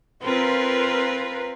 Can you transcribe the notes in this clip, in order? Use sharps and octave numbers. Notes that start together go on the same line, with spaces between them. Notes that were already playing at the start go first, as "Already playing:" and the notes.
C4 F4 A#4 B4